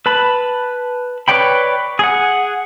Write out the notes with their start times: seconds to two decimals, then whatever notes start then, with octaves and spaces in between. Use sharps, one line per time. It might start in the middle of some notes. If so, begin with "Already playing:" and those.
0.06 B4 A5 B5
1.28 B4 C#5 D5 G5 B5
1.99 G#4 F#5